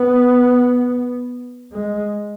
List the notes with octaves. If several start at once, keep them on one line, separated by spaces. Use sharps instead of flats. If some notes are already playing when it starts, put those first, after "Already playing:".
Already playing: B3
G#3